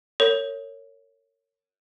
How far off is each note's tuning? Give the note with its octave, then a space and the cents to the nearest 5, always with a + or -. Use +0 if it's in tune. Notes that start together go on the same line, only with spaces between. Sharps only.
A#4 -35 C#5 +0